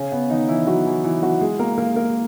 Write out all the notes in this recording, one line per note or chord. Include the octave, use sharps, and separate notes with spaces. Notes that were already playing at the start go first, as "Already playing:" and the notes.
Already playing: C#3 C#4
B3
D#3 D#4
E3 E4
F#3 F#4
E3 E4
E3 E4
F#3 F#4
G#3 G#4
A#3 A#4
A#3 A#4
A#3 A#4